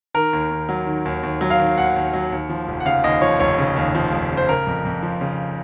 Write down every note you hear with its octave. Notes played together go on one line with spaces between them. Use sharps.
D#3 A#4
D#2
D#2
F#3
D#3
D#2
D#2
F#3
F5
D#3
D#2 F#5
D#2
F#3
D#2
F3
F1
F#5
C#3 F5
D#2 D#5
F3 C#5
F1 C#5
C#3
D#2
F3
F1
C#3
C5
C#3 A#4
F2
F2
F3
C#3